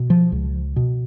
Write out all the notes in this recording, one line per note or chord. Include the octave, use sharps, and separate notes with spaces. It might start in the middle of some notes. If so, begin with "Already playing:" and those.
Already playing: B2
F3
C#2
B2